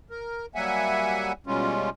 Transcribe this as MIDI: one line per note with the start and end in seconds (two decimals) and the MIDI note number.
0.10 0.46 70
0.55 1.32 54
0.55 1.32 55
0.55 1.32 58
0.55 1.32 76
0.55 1.32 78
0.55 1.32 80
1.47 1.90 47
1.47 1.90 55
1.47 1.90 56
1.47 1.90 61
1.47 1.90 65